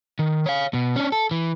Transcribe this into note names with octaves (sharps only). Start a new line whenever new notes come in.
D#3
C#5 F5
B2
C#4 D4
A4
E3